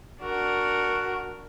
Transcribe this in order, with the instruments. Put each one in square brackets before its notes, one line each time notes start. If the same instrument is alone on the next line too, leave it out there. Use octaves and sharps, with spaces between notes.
[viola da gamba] D4 A#4 [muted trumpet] F#4